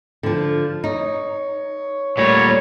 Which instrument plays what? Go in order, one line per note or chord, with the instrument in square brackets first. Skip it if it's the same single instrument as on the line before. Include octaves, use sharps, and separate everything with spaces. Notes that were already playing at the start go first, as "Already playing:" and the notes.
[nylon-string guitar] D3 F3
[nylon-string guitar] D#4 [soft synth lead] C#5
[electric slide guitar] A#2 G3 [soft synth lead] A3 [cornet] C#5